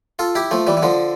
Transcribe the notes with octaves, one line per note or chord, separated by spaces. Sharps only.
F4 A4
E4 G4
F3 A3
E3 G3
E3
D3 F3